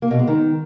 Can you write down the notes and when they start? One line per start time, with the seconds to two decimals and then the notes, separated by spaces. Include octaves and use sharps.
0.02 A#3
0.11 B2
0.19 G#3
0.27 D#3